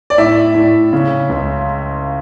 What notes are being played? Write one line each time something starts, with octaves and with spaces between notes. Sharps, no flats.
D5
A2 E5
A2
C#3
C#2